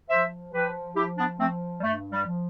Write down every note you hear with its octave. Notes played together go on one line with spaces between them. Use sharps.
F3 C5 E5
F3 G4 B4
F3 E4 G4
B3 D4
F3 A3 C4
G3
G2 A3
G3
F3